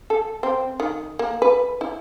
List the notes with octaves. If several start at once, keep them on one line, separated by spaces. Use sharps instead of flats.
A4
C4
D#3
A#3
B4
E4